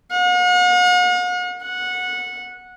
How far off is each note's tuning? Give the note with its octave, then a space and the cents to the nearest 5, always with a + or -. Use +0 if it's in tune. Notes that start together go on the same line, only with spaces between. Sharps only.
F#5 -45
F#5 -15